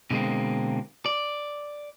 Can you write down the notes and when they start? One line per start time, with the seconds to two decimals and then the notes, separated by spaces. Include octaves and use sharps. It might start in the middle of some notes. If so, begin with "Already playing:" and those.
0.11 B2 D3 G#3 A#3 C4
1.06 D5